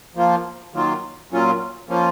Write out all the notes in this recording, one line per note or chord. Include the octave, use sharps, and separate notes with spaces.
F3 A#3 F4
D#3 F#3 A#3 F4
A#2 F#3 C#4 F4
F3 A#3 C#4 F4